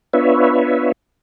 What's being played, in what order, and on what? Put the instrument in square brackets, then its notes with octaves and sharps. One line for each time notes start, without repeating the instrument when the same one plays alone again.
[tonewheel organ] B3 D4 F4 B4 C#5 E5